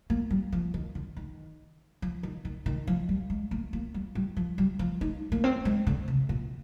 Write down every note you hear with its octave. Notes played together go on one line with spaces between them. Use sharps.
A#3
G3
F3
D#3
D3
D#3
F3
D#3
D#3
D#3
F3
G3
G#3
A#3
A#3
G3
G3
F3
G3
F3
D#4
A#3
C4
G#3
D3
C3
A#2